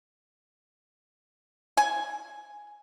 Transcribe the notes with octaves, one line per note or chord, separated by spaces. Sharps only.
G#5